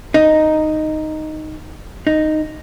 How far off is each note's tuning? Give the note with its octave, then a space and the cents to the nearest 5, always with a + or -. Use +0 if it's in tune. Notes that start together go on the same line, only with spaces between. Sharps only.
D#4 -5
D#4 -5